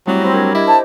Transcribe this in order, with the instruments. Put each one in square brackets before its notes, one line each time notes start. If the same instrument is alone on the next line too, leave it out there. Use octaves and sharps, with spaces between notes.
[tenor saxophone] F#3 [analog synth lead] G3 [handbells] A3 C4 E4
[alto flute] C4 [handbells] B5 A#6
[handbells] D4 A#4 G#6
[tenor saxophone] E4 [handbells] G4 D#5 D6
[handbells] C5 [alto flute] A5